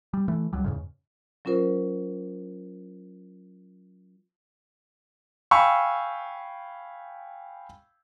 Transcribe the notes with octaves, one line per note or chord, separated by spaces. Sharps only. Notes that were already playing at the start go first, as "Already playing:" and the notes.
G3
E3 A3
C#2 F#3 G3
E2 G#2 C#3
F#3 C#4 F4 A#4 C5
F5 G5 G#5 B5 C#6 E6